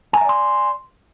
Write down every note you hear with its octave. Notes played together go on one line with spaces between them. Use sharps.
D5 E5 G#5 A#5 C6